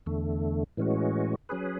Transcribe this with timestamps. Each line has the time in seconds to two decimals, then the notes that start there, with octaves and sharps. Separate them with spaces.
0.06 E2 D3 A3
0.77 A2 E3 G#3 C#4 F#4
1.49 F#3 C#4 G#4 B4